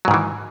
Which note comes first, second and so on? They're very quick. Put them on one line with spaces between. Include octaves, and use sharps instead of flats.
F#3 G#2 D#3 E3